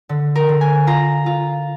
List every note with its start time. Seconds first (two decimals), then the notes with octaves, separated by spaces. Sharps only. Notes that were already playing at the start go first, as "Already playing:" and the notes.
0.09 D3
0.35 A#4
0.49 D3
0.61 G#5
0.87 F4 A#5
1.26 F4